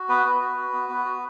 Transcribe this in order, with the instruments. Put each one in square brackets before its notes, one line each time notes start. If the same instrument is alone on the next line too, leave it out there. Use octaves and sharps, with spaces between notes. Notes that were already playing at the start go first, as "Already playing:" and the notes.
Already playing: [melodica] F#4
B3 B4
B3
F#4
F#4
B3
B3
F#4